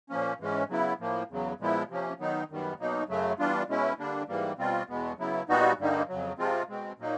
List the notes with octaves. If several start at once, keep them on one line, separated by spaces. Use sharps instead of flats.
A#2 F3 A#3 C#4
G#2 E3 G#3 C#4
C#3 F#3 B3 E4
A2 F3 A#3
E2 C#3 F#3
A#2 F3 G#3 B3 E4
C3 F3 A#3 C#4
D#3 F#3 B3 D#4
F#2 D#3 G3 B3
B2 F#3 A#3 D#4
F#2 C#3 F#3 A3
E3 G3 B3 D4 F4
B2 G#3 C#4 E4
D3 G3 A#3 D4
G#2 E3 G3 A#3
B2 G3 C4 F4
E2 B2 G#3 B3
C#3 F#3 B3 E4
A#2 G3 B3 D#4 F#4
G2 D3 G3 A#3 D#4
F2 C#3 F#3
C3 F3 G#3 C4 F4
B2 G#3 C4
A#2 F#3 A#3 D#4